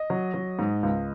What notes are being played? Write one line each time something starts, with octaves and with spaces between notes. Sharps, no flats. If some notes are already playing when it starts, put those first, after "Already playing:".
Already playing: D#5
F#3
F#3
G#2
C#2